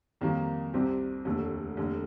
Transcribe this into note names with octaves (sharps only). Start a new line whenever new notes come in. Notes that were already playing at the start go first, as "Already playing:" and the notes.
F2 D#3 G3 A#3
C2 C3 G3 C4 G4
F1 D#2 D3 A3
F1 D#2 D3